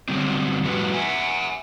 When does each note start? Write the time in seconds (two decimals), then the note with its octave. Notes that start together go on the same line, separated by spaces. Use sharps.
0.09 D3 F#3 G3 C4
0.64 F2 A2 G3 F#4 B4
0.94 E5 F#5 G#5